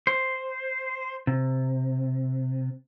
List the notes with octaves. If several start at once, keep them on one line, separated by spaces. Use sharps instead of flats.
C5
C3